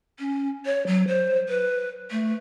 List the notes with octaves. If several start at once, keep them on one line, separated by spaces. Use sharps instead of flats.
C#4
C#5
F#3
C5
B4
A3